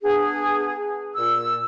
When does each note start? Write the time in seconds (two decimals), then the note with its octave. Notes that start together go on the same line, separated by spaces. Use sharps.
0.04 B3 D4 G#4
1.16 A#2 E6